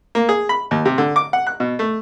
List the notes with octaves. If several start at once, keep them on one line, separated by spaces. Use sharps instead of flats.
A#3
G#4
B5
D#2
C3
D3
D6
F#5
F#6
B2
A3